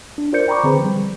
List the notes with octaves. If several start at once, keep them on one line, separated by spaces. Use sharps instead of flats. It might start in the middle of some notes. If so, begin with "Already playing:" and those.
D4
F4 A#4 C5 D5 G6 C#7
G5 A#5 B5 C#6 D6
D3 C4 G#4 B4 C5
F3 G3